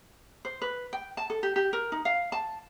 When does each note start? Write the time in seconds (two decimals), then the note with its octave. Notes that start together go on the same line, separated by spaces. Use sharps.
0.45 C5
0.62 B4
0.93 G5
1.17 A5
1.30 A4
1.43 G4
1.56 G4
1.73 A#4
1.92 D#4
2.05 F5
2.32 A5